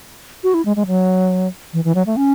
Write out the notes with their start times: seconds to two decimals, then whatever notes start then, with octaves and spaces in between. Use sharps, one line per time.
0.44 F#4
0.54 E4
0.65 G#3
0.76 G#3
0.87 F#3
1.73 E3
1.84 E3
1.95 F#3
2.06 A3
2.17 C#4